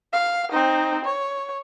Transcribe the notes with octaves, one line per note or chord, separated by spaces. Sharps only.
F5
C4 D#4
C#5